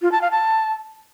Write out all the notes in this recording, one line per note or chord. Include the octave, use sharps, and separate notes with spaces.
F4
A5
F5
A5